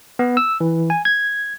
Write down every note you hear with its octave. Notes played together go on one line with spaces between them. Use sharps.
B3
E6
E3
G#5
G#6